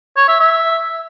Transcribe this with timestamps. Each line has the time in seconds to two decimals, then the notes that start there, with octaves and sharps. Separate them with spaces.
0.16 C#5
0.28 E5
0.40 E5